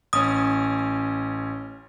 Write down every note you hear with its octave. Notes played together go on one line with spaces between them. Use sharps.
A1 C#4 D#6